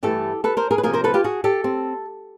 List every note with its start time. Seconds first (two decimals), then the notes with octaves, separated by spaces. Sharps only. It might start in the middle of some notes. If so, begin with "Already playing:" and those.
0.03 G2 E3 A3 G4 A4
0.44 A4 B4
0.57 A#4 C5
0.71 G#4 A#4
0.78 B4
0.83 D2 C3 F3 A#3 G#4 A#4
0.94 A#4 C5
1.04 A4 B4
1.14 F4 G4
1.24 F#4 G#4
1.44 G4 A4
1.64 C4